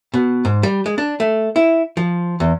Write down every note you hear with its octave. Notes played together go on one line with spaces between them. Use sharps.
B2
G#2
G3
G#3
D4
A3
E4
F3
E2